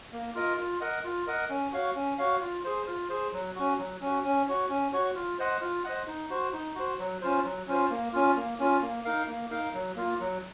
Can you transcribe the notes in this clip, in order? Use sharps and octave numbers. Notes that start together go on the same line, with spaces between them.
A#3
F4 A#4 D#5
F4
A#4 D#5 F#5
F4
A#4 D#5 F#5
C#4
F#4 C#5 F5
C#4
F#4 C#5 F5
F4
G#4 C5
F4
G#4 C5
F#3
C#4 F#4
F#3
C#4 F#4
C#4
F#4 C#5
C#4
F#4 C#5
F4
C5 D#5 F#5
F4
C5 D#5 F#5
D#4
F#4 C5
D#4
F#4 C5
F#3
C#4 F4 C5
F#3
C#4 F4 C5
A#3
C#4 F4
A#3
C#4 F4
A#3
D#4 A#4 F5
A#3
D#4 A#4 F5
F#3
A#3 F4
F#3